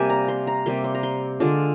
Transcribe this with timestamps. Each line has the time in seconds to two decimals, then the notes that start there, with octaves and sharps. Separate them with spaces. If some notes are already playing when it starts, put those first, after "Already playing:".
Already playing: C3 G3 A#3 G#5
0.10 A#5
0.28 C6
0.47 A#5
0.66 C3 G3 A#3 C6
0.84 C6
0.95 A#5
1.03 C6
1.40 D3 G#3 D4 F4